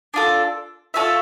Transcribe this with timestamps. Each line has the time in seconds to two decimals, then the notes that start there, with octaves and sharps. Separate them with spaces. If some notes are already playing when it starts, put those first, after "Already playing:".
0.14 D4 F4 A4
0.94 F4 A4 C#5 E5